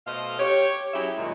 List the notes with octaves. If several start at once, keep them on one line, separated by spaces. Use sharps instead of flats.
B2 A3 C5 D#5 F5
G4 C#5
F#3 C#4 E4 G4 G#4 E5
F#2 A#2 D#3 G3 G#3